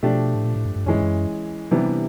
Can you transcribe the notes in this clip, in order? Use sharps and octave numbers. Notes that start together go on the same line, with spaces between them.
B2 F3 A3 D4 G4
A2
A#2
A2
G2
G2
F#2 E3 G#3 C#4
G2
F#2
C3 E3 G3 B3 D4